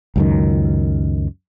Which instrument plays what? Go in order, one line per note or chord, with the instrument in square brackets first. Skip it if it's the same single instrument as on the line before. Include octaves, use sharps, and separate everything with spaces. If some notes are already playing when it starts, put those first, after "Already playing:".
[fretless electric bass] C#2 F#2 D#3